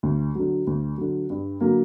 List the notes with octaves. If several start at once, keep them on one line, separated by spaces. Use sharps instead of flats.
D2
D3 F#3
D2
D3 F#3
G2
D3 F#3 A#3